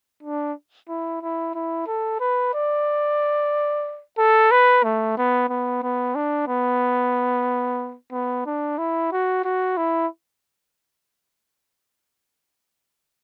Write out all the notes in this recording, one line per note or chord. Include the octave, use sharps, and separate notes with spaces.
D4
E4
E4
E4
A4
B4
D5
A4
B4
A3
B3
B3
B3
D4
B3
B3
D4
E4
F#4
F#4
E4